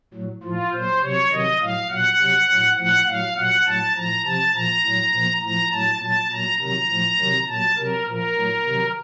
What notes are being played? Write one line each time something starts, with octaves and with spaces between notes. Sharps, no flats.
A2 F#3
A2 F3 F4
A#2 F#3 C5
C3 F#3 C#5
C3 D#3 F#3 D#5
A2 F#3 F5
A#2 F#3 F#5
C3 F#3
A2 F#3
A2 F3 F#5
A2 F#3 F5
A#2 F#3 F#5
A2 F#3 A5
A2 F3 A#5
C3 F3 A5
A#2 F3 A#5
A2 F#3
A#2 F3
A2 F3 A#5
A2 F#3 A5
A#2 F#3 A5
A#2 F#3 A#5
C3 D#3 F#3 A#5
A2 F3
C3 D#3 F#3
A#2 F#3 A5
C3 F#3 A#4
A#2 F3 A#4
A2 F#3
C3 D#3 F#3